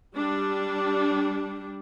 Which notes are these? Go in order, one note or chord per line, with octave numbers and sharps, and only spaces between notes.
G3 D4